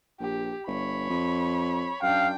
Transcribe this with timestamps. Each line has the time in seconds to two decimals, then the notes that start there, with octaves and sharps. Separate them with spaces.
0.20 A#1 G4
0.67 G1 C#5 B5
1.10 F2
2.02 F#2 D4 F5 G5